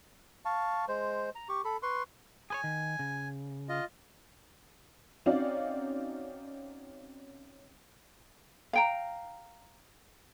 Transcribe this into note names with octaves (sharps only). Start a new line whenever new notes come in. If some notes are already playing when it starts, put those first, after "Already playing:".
F5 A5 C#6
G#3 C5
A#5
G4 C#6
A4 B5
B4 C6 C#6
G#4 B4 C#5 G#5
D#3
C#3
F4 D#5
C4 C#4 D#4 F#4 D5 F5
F5 G5 A#5